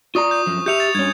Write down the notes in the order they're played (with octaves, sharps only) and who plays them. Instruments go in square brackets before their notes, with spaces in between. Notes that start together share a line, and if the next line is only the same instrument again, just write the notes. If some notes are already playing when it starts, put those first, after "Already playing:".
[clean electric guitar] F4 D5 A#5 [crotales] C#6 D#6
[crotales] G6
[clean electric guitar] F#2 F3
[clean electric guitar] G4 E5 [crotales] G6 C#7 F7
[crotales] A6
[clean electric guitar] G2 C#4 [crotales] G#6